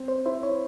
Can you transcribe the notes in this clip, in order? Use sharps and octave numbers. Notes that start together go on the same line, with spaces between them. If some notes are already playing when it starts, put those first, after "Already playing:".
Already playing: C4
C5
E4 C5
C#5